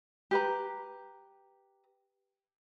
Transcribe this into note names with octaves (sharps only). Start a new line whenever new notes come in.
G4 B4 A#5